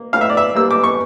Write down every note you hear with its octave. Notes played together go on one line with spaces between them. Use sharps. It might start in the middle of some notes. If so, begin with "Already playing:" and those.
Already playing: A#3
A2 F5
E5
D5
E5
G3 A#3 E6
D6
C#6